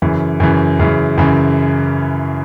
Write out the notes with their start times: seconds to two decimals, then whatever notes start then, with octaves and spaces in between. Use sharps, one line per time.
0.02 F#2 C#3 E3
0.40 F#2 C#3 E3
0.79 F#2 C#3 E3
1.18 F#2 C#3 E3